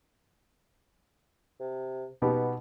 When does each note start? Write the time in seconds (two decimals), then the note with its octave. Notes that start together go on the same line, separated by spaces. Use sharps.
1.60 C3
2.22 B2 B3 D#4 G4